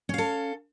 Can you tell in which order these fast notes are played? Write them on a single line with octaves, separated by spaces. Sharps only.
C#4 F5 A4